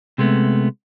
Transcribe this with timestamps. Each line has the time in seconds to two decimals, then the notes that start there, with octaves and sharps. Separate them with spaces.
0.18 C3 G#3 A3 B3